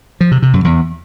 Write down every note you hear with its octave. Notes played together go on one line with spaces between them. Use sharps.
F3
C3
C3
F#2
E2